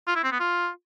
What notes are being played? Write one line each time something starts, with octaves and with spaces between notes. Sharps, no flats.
F4
E4
C4
B3
F4